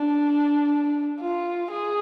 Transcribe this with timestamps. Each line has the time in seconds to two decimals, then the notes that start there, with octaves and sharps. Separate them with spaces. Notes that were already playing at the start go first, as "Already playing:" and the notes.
Already playing: D4
1.20 F4
1.70 G#4